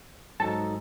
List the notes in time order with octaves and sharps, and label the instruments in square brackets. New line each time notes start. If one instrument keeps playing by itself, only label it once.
[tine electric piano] G#2 F#3 D#4 [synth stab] A4